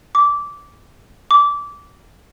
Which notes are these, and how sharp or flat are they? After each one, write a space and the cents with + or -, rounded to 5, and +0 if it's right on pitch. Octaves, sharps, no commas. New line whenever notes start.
D6 -15
D6 -20